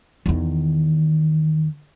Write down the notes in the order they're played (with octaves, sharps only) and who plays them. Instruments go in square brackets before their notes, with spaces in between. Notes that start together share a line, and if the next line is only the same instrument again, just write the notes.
[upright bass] E2 D#3